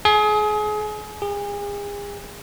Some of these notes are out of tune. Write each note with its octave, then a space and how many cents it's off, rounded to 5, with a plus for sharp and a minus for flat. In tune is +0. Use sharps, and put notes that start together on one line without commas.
G#4 +30
G#4 -35